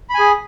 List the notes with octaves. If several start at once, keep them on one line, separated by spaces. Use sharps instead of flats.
G#4 G#5 B5